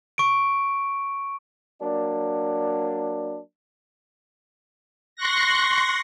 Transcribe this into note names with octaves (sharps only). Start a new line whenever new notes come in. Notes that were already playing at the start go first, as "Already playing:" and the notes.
C#6 D7
F#3 A#3 D4
C6 C#6 F#6 A#6